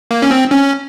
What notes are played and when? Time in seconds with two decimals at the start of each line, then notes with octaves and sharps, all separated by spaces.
0.11 A#3
0.22 C#4
0.31 C4
0.51 C#4